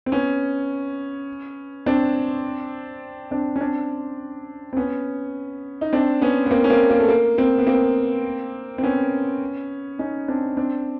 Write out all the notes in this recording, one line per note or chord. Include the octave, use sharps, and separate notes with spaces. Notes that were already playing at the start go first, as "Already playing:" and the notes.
C4
B3 C#4
C4 D4
C4 D4
C#4
C4 D4
C4
B3 C#4
D#4
C4 D4
B3 C#4
B3
A#3 C4
C#4
A#3 C4
A#3
A3
A#3
A#3 C4
B3
A#3 C4
C4
B3 C#4
C#4 D#4
C4 D4
C4 D4